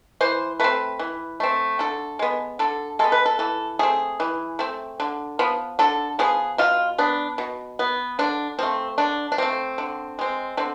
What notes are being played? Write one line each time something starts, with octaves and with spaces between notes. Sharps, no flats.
E3 C5
A3 C4 B4
E3
A3 C4
D3 A4
G#3 B3
D3 A4
G#3 B3 A4
B4
A4
E3 A4
A3 C4 G#4
E3
A3 C4
D3
F3 B3
D3 A4
F3 B3 G#4
B2 F4
B3 D4
B2
B3
D3 D4
F3 A3 C4
D3 D4
D4
F3 A3 C4
D3
G#3 C4
D3 C4